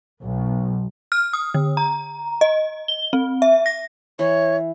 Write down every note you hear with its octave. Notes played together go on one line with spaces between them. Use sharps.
B1
F6
D#6
D3
A#5
D#5
G7
C4
E5
A#6
E3 C#5